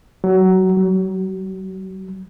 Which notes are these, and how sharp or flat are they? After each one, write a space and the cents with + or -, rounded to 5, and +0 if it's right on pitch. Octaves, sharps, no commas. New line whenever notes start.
F#3 +20
F#3 +35